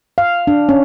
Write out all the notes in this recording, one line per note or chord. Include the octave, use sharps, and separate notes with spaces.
F5
D4
C#4